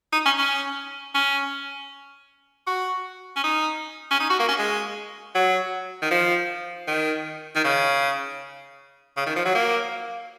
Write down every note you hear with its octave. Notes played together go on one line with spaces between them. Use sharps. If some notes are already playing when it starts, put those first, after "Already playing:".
D#4
C#4
C#4
C#4
F#4
C#4
D#4
C#4
D#4
F#4
A#3
C#4
G#3
F#3
D#3
F3
D#3
D#3
C#3
C#3
D#3
F3
F#3
A#3